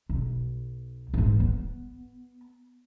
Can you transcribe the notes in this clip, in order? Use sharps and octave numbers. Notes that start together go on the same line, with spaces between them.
B1
G#2 E3
B3